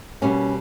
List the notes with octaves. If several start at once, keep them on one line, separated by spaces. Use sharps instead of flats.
B2 G3 A#3 C#4